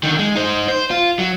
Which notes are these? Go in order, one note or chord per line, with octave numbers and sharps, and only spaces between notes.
D3 D#3
G#3
D#4 C5
C5
F4
F#3